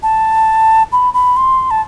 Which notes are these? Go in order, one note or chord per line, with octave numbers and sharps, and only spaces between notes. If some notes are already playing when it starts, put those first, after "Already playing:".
A5
B5
B5
C6
A5